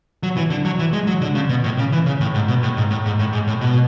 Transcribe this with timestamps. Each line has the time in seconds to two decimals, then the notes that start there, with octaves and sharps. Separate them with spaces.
0.23 F#3
0.37 E3
0.50 D3
0.65 F#3
0.79 E3
0.93 G#3
1.07 F#3
1.22 D3
1.35 C#3
1.49 B2
1.64 A2
1.78 C#3
1.92 E3
2.06 C#3
2.21 A2
2.34 G#2
2.48 B2
2.63 A2
2.77 G#2
2.91 A2
3.06 G#2
3.19 A2
3.33 G#2
3.47 A2
3.61 B2